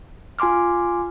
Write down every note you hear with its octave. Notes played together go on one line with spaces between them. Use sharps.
F4 G#5 C6 D6 F6